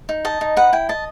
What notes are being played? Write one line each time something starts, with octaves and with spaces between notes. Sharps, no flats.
D#4
D#5 A5
D#4
B4 F#5
E4 G5
D#5 A5